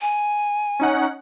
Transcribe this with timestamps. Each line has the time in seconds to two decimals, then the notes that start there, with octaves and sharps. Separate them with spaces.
0.01 G#5
0.80 C#4 D#4 F#5